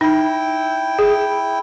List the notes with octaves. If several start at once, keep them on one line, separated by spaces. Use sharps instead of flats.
D#4 E4 G5
G#4